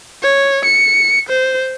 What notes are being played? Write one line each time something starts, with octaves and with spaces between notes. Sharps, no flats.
C#5
C#7
C5